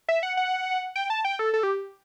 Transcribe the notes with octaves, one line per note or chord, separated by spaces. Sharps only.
E5
F#5
F#5
G5
A5
G5
A4
A4
G4